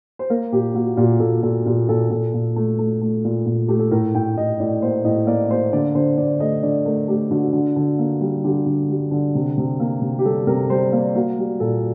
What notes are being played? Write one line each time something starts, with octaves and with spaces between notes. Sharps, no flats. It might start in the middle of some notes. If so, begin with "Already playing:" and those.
C5
A#3 A#4
A#2 G4
A#3 F#4
A#2 G4
A#2 A4
A#2 A4
A#2 G4
A#2 A4
A#2 A4
A#2
A3
A3
A3
A#2
A#2
A3 G4
A4
A2 A#4
A2 G5
A2 D#5
A2 D5
A#3 C5
A2 D#5
A#3 D5
A#3 C5
D3 D5
D3 C5
D3 D5
A3 D#5
D3 D5
A3 A#4
A3 G4
D3 F#4
D3
D3
A#3
G3
D3 G4
D3
G3
D3
C3
C3
A#3
C3
G4
G3 A4
C3 A#4
G3 C5
A#3 D5
A#3 F#4
G3
A#2 A4